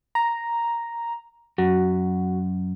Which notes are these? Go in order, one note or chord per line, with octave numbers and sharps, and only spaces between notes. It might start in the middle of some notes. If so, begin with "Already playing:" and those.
A#5
F#2 F#4